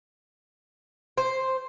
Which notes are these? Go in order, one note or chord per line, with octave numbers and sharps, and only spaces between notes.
C5